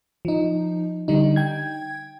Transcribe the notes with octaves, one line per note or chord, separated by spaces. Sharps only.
F3 D#4
D3 G3 D#4
G5 G#6